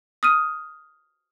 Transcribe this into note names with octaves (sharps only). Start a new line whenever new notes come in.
D#6 F6 D#7